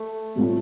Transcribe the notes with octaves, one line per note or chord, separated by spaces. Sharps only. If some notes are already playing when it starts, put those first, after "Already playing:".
Already playing: A3
A2 G3 C4 F4